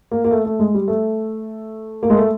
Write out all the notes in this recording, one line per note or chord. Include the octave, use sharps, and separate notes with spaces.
A#3
A#3
A3
A3
G#3
G3
A3
A#3
G#3
A3